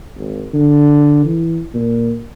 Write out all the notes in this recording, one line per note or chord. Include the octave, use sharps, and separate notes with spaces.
G#1
D3
E3
A#2